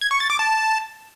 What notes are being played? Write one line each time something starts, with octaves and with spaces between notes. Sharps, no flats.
G#6
C#6
A6
D6
A5